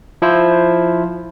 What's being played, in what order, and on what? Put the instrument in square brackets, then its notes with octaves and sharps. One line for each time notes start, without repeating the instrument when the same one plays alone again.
[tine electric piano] F3 E4 C5